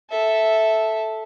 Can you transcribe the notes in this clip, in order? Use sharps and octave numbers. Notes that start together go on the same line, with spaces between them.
A4 E5